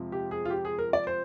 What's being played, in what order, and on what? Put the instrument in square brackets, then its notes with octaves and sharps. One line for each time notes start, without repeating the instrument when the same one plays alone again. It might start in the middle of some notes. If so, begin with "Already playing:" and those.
Already playing: [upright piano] F2 C3 F3 G#3 C4
[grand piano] G4
G#4
F4
G4
G#4
A#4
D5
C5